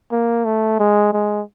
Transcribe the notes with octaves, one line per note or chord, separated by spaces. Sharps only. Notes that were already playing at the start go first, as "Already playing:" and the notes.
A#3
A3
G#3
G#3